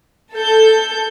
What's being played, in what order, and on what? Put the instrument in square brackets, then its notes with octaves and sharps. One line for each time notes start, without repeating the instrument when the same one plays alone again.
[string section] A4 G6